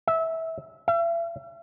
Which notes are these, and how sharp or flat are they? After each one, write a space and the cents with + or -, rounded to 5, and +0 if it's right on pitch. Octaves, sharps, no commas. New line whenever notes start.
E5 -20
E5 +40